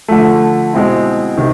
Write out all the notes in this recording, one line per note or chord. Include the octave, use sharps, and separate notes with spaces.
D3 F3 A3
B2 G#3 C4 E4
C3 D#3